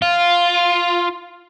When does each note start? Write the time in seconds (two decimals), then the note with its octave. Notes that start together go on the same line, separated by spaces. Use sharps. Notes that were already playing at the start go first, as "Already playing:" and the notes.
0.02 F4